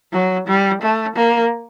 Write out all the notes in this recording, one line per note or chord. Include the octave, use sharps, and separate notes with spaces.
F#3
G3
A3
A#3